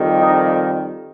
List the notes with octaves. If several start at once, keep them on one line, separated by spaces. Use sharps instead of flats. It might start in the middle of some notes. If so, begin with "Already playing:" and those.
Already playing: F2 D#3 G3
D#4